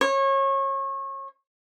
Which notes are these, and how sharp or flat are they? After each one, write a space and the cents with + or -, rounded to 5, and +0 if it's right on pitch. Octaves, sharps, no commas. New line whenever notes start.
C#5 -30